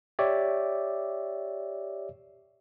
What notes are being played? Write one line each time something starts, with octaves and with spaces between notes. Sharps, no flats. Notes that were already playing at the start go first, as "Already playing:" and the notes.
G4 C#5 D5 E5